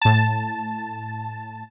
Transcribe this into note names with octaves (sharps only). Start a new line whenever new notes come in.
A2 A5